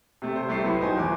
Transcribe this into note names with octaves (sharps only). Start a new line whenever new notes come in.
C3 A3
C5
C2 A3 G4 C7
A2 F#3 B3
D#4 C5 G#5
G1 E2 G#5 D6